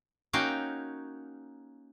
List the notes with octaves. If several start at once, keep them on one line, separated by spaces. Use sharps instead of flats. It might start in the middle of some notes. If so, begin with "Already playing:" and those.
A#3 C#4 D#4 F#4 F5 G5